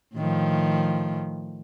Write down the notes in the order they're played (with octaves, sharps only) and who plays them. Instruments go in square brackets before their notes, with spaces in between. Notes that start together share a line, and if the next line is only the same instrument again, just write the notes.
[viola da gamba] A2 D#3 F3